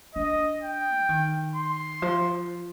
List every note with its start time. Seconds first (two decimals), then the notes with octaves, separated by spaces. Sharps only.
0.15 D4 D#5
0.62 G5
0.98 F3
1.09 D#3
1.55 C6
2.02 F3